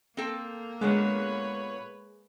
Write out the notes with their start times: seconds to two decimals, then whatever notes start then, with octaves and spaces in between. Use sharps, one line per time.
0.17 A#3 C4 A4 G5
0.81 A#2 D3 G#3 B3 B4 C#5